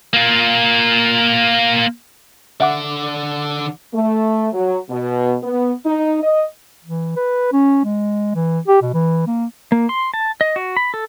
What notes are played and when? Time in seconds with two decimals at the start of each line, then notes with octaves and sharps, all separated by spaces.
0.13 A#3 F4
2.60 D3 D5 E5 F#5 D6
3.94 A3
4.54 F#3
4.90 B2
5.43 B3
5.86 D#4
6.23 D#5
6.84 E3
7.16 B4
7.52 C#4
7.85 G#3
8.35 E3
8.68 G4
8.82 B2
8.93 E3
9.27 A#3
9.72 A#3
9.89 C6
10.14 A5
10.41 D#5
10.56 F#4
10.77 B5
10.94 A4